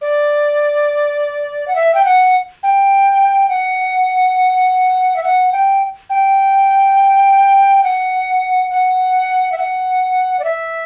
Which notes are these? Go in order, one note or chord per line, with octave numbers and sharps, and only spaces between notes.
D5
F#5
E5
G5
F#5
G5
F#5
E5
F#5
G5
G5
F#5
F#5
E5
F#5
D5
E5